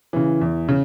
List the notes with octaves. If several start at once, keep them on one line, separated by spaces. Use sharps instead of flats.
C#3 E3
E2
C#3